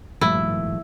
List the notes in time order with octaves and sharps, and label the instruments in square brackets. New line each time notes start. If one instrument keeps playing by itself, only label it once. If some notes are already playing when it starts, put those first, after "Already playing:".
[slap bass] G#1 F3 A3 [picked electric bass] G2 A#2 G3 [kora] E4